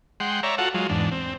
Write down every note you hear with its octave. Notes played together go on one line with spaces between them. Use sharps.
G#3 F#5 G5 C6
C#5 D5 E5 A#5
F4 F#4 A4 F#5
F#3 G#3 F4
E2 G#2 D4
C4